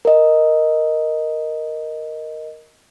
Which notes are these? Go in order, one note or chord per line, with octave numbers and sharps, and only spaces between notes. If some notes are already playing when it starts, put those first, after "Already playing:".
A#4 D#5